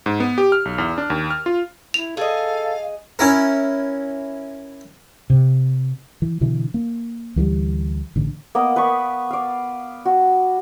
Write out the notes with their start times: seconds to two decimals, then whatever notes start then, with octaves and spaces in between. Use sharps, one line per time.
0.06 G#2
0.20 B3
0.38 G4
0.52 F6
0.65 B1
0.78 E2
0.98 D4
1.10 D#2
1.30 F6
1.46 F4
1.94 E4 F7
2.17 G#4 A4 D#5 F5
3.19 C#4 E4 A#4
5.30 C3
6.22 E3
6.41 B2 D3 E3
6.74 A#3
7.36 D2 E3 F3 G3
8.16 A1 D3
8.55 A#3 B3 D#5
8.76 B4 D5 B5 C#6
9.31 D5 F5
10.05 F#4